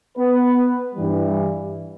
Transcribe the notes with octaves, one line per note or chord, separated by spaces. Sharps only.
B3 B4
G2 E3 G3